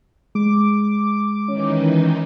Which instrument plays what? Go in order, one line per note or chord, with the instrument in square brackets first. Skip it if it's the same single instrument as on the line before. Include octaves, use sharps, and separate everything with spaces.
[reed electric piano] G#3 [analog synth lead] D6
[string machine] D#3 E3 D#4 [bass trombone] C#4